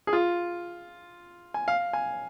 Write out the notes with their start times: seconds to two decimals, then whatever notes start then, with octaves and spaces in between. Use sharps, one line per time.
0.07 G#4
0.13 F4
1.54 G#5
1.68 F5
1.93 G#5